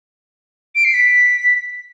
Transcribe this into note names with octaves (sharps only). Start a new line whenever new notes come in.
D7
C7
B6